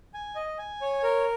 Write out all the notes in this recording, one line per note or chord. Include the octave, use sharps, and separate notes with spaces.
G#5
D#5
G#5
C#5
A#4